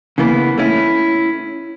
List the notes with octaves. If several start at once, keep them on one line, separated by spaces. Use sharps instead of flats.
C#3 E3 A#3 B3 E4
A3 C#4 E4